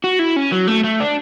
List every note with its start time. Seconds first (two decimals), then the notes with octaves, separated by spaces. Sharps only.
0.04 F#4
0.19 E4
0.36 C#4
0.52 F#3
0.68 A3
0.84 A3
1.00 D4